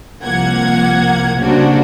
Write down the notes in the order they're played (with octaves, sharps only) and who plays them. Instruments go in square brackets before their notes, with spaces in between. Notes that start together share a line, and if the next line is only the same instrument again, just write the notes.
[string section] C2 F3 A#3 F#5 G#6
C#3 G3 A#3 D4 F#4 C5